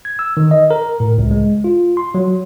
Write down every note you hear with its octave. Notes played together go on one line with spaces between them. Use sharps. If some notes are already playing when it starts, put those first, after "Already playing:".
G#6
E6
D#3
D#5
A#4
A2
C#2
G#3
F4
C6
F#3